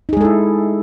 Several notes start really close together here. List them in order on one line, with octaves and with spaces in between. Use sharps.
D#4 G#4 G#3 A4 E4